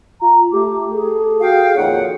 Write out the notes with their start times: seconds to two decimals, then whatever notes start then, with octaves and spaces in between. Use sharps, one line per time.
0.21 F4 A#5
0.53 A3 G4 D6
0.93 G#4 A4
1.41 F#4 F5 G5
1.76 F2 A#2 D#3 C#5 F#5